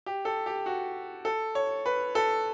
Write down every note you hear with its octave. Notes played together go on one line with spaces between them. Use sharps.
G4
A4
G4
F#4
A4
C#5
B4
A4